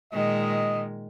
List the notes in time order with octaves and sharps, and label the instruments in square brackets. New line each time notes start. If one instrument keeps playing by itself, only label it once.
[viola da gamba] A#2 D#3 G#3 [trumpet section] D#5